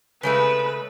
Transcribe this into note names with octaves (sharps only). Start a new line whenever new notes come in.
C#3 G#3 A3 B4